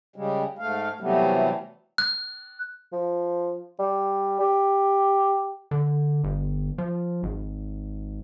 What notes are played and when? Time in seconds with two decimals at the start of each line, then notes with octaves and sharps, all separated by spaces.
0.16 C#3 G3 G#3
0.59 G#2 A3 F5
1.01 C3 E3 F#3 G3 A3 B3
1.98 F#6
2.93 F3
3.79 G3
4.40 G4
5.71 D3
6.24 G1
6.78 F3
7.23 G#1